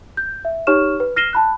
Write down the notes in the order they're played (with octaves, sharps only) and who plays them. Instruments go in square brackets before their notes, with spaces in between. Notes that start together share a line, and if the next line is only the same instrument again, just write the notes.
[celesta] G6
E5
D#4 G4 C#5 C#6 F6 E7
B4
F6 A#6 C7 D#7 E7 G7
A5 B5 F#6